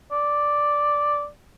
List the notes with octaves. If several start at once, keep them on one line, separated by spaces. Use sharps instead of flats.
D5